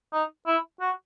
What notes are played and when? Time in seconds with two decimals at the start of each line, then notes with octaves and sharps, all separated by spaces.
0.13 D#4
0.47 E4
0.81 F#4